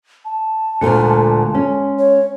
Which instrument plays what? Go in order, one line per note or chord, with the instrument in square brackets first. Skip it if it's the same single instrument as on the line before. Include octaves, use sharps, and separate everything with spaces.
[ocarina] A5
[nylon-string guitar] D2 A#2 D3 [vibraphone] G#3 C6
[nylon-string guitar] C#4
[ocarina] C#5